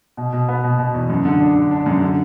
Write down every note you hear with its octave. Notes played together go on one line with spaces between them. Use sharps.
B2
B2
B3
B2
B2
E2
F#2
D3
D4
D3
D4
F#2
D3